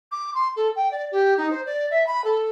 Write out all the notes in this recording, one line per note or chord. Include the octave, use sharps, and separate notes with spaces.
D6
C6
A4
G5
D5
G4
D#4
C5
D5
E5
B5
A4